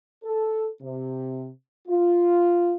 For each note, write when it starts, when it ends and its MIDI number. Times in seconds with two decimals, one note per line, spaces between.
0.24 0.67 69
0.82 1.48 48
1.88 2.75 65